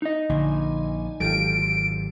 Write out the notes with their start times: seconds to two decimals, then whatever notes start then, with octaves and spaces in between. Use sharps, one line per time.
0.02 D#4 D#5
0.29 A#1 D3 G#5
1.20 G#1 F#3 F4 G4 A4 D7